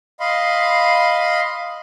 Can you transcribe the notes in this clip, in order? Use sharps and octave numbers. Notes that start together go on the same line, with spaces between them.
D#5 F5 B5 C6